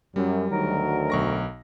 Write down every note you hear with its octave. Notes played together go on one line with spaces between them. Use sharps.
F#2 G3
D2 D#3 F#3 A#4
B1 C#6 A#6